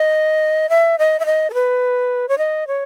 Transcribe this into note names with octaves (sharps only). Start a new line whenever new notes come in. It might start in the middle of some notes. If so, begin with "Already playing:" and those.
Already playing: D#5
E5
D#5
E5
D#5
A4
B4
C#5
D#5
C#5